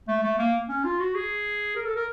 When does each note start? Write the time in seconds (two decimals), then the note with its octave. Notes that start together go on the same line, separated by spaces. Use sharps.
0.08 A3
0.23 A3
0.39 A#3
0.69 C#4
0.84 F4
1.00 F#4
1.15 G#4
1.76 A#4
1.86 A4
1.96 A#4